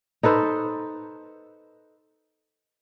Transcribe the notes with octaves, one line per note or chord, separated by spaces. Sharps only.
D#4 A4 B4 C5